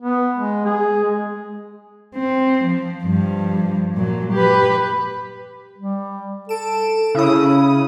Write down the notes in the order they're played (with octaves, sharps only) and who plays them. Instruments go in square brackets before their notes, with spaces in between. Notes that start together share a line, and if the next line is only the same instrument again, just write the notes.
[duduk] B3
G#3
G#4
G#3
[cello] C4
F3
G2 F3
A#2 F#3
G4 B4
[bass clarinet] G3
[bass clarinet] A4 [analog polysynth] D7 E7
[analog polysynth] C#3 D#6 [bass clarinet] E4